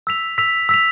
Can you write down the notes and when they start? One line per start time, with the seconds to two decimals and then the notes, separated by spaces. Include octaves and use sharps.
0.07 E6 B6 F7
0.38 E6 B6 F7
0.69 E6 B6 F7